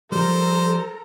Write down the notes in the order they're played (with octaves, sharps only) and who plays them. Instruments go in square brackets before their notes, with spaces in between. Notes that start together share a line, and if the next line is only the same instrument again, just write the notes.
[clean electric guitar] F3 G3 [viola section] A4 A#4 A#5 [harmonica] C5